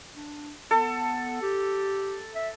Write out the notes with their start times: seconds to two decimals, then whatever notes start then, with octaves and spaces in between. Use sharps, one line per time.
0.15 D4
0.71 B3 A4
1.42 G4
2.35 E5